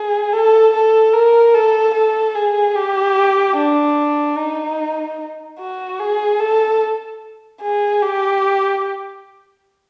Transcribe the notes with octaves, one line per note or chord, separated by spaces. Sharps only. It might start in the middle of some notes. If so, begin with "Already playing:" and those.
Already playing: G#4
A4
A4
A#4
A4
A4
G#4
G4
D4
D#4
F#4
G#4
A4
G#4
G4